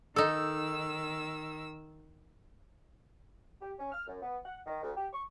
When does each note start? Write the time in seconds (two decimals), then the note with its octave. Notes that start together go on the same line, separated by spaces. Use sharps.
0.16 D#3 D#4 A4 E6
3.62 G4
3.79 C#4
3.92 F6
4.07 F#2
4.22 B3
4.45 F#5
4.66 D#3
4.83 D2
4.96 G4
5.13 C#6